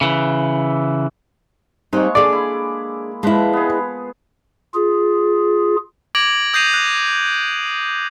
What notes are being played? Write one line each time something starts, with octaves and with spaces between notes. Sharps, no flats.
C#3 E3
G3 G#3 A#3 C4 D#4 C#6
D4 G#4 A4 D5
E4
F3 G#3 E4 B4
B3 G#4
F4 G#4
D6 G#6 A#6 D7 F#7
D#6 G6 A#6 C7 D#7 F7
F#6